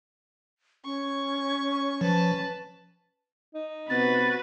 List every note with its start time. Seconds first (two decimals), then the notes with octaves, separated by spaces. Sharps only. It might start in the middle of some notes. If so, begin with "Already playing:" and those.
0.85 C#4 C#6
2.01 F3 B4 A5
3.55 D#4
3.90 C3 B3 C4 F#4 B4 A6